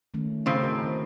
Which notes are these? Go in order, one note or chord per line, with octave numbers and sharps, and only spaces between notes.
D#3 A3 C#4
A2 C#3 C4
F#4 A#4 D#5
D#3